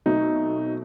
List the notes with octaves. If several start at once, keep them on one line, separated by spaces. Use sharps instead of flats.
B2 F#3 A3 C4 D#4